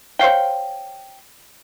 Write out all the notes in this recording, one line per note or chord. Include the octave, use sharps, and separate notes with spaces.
C5 C#5 F5 G5